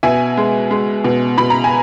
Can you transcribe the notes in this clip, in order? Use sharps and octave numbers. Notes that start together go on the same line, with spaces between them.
B2 E5 G#5
G#3
G#3
B2
B2 B5
A#5
G#5